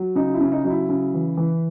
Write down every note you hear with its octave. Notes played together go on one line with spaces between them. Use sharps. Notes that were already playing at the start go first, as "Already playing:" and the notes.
Already playing: F#3
C#3 D#4
E4
C#3
D#4
F#3 D#4
E4
C#3
E3
E3